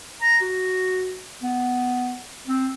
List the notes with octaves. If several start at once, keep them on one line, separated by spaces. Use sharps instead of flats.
A#5
F#4
B3
C4